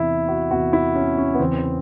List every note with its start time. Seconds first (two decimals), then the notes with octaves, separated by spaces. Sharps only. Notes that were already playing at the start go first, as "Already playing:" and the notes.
Already playing: E2 C3 E3 E4
0.28 F#4
0.51 E2 C3 E3 F#4
0.73 E4
0.95 C#4
1.18 C#4
1.34 B3
1.40 E2 C#3 E3 C4